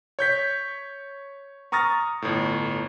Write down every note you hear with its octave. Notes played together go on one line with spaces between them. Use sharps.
C#5 G6 B6
A#5 C#6 D#6 F6 A6 A#6
G1 A2